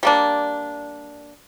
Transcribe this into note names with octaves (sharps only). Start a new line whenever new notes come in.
G3 A#3 D4